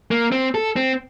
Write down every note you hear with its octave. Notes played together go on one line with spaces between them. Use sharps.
A#3
C4
A4
C4